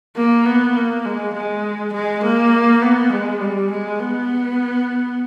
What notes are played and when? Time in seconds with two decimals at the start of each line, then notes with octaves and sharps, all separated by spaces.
0.17 A#3
0.46 B3
0.76 A#3
1.06 G#3
1.35 G#3
1.93 G#3
2.24 A#3
2.82 B3
3.12 G#3
3.40 G3
3.71 G#3
3.99 B3